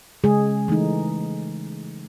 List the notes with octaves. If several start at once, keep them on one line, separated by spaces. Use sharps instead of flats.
C#3 G#3 G#4
E3 A3 D#4